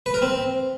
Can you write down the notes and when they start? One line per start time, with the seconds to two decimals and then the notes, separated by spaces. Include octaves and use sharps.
0.06 B4
0.14 A#4
0.22 C4